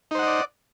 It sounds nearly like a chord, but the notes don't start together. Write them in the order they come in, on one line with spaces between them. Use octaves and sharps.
D#4 C5 F#5 D#5 D5